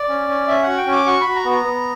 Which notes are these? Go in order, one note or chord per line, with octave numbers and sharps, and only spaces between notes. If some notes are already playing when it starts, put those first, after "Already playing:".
Already playing: D5
C#4
C#4
C#4 E5
F#4 F#5
G5
C#4
D6
F#4 C#6
F#4 B5
A#5
B3
A#5
B3